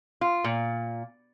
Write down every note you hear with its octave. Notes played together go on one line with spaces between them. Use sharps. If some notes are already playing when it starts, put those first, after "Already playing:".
F4
A#2